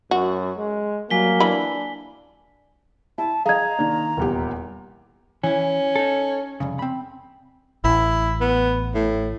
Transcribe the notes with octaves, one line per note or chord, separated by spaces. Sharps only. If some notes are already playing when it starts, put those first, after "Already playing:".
F#2 F#4
G#3
F#3 G3 A#3 G#5 B6 G7
E3 D4 B5
E4 A5
G#4 D#5 F5 A#5 G#6
D#3 A#3 D4
D#1 E2 G4
E3 C#4 E4
D#4 A4
C2 F2 C#3
C4 B5
A1 E4
B3
A2